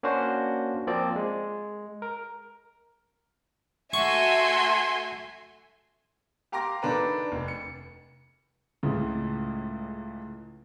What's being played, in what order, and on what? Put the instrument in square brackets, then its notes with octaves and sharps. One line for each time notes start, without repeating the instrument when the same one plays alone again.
[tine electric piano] A#3 C#4 D4 F#4 C5
F3 A#3 C4 D5
G#3
A#4
[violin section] A3 F#4 E5 [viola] G#5 C6 [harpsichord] C#6
[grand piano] G4 F5 A#5 C6 D6 A#6
D#3 D4 A4 B4 A#5
F1
C#7
C#2 A2 C#3